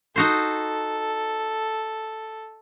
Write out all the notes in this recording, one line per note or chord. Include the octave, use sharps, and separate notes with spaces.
D#4 F#4 A4 C5